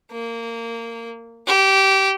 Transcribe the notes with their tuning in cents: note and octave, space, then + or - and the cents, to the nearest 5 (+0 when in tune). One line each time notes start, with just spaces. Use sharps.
A#3 -20
G4 -20